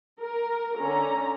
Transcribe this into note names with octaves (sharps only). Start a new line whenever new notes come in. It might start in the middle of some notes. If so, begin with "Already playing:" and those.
A#4
D3 C#4 A#5